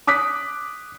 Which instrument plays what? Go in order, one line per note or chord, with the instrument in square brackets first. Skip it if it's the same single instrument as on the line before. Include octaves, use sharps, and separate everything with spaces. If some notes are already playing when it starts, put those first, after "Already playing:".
[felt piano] D6 D#6 F#6 B6